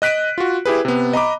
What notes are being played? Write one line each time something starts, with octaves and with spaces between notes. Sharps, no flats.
D#5 F#6 B6 D7 D#7
F4 F#4
E4 G4 G#4 B4
C3 B3
D#5 A#5 B5 D6